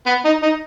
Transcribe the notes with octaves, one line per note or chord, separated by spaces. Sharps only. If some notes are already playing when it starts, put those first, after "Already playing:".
B3
D#4
D#4